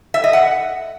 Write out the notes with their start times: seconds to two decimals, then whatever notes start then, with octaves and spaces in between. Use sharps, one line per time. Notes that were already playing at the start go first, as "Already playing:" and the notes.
0.14 E5
0.24 D#5
0.33 F#5